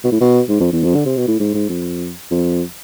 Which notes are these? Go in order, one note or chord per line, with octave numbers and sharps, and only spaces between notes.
B2
A2
B2
G#2
F2
E2
F2
D3
C3
B2
A2
G#2
G#2
F2
F2